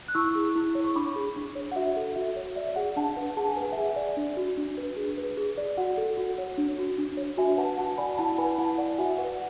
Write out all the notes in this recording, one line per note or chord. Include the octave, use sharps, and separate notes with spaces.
F#6
E4 C#6 E6
G#4
E4
C#5
C#6
D4 B5 D6
G#4
D4
C#5
F#5
F#4 E5
A4
F#4 E5
C#5
D5 E5
G#4 F#5
D4 F#5 A5
B4 F#5
G#4 A5
G#5
B4 F#5
G#4 E5 G#5
D5
D4
F#4
D4
B4
G#4
B4
G#4
D5
F#4 F#5
A4
F#4
C#5
D4
F#4
D4
C#5
F#4 E5 G#5
B4 F#5 A5
F#4 F#5 A5
D5 G#5 B5
E4 F#5 A5
B4 G#5 B5
E4 F#5 A5
D5 F#5
F#4 E5 G#5
B4 F#5